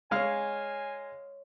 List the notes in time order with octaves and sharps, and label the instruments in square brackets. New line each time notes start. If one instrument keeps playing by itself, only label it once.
[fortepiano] G#3 F5 F6 [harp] C#5 D#5 [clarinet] G#5